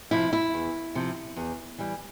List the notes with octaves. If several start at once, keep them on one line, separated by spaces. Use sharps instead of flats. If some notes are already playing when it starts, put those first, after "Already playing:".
C3 F3 E4
E4
E2
C3 F3
E2
E3 G3